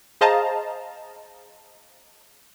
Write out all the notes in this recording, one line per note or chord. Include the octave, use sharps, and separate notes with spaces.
G#4 C5 D#5 F5 A5 A#5